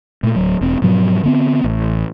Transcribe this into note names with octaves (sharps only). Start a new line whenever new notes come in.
A#2 A3
D1 F#3
E1 C4
G#2 B2 F3 F#3
D3 B3 C4
A1